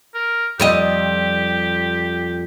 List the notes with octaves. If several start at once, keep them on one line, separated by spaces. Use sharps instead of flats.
A#4
F2 G3 G4 D#5